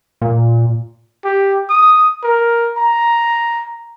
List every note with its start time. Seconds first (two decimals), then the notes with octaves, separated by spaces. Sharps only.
0.21 A#2
1.24 G4
1.70 D#6
2.23 A#4
2.77 A#5